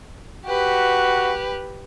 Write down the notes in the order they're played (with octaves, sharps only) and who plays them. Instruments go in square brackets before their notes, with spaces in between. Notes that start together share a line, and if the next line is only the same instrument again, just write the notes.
[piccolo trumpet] F#4 [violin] G4 B4